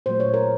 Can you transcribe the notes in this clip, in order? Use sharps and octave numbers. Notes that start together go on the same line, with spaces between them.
A#2 F#3 A3 C5
C#5
A#4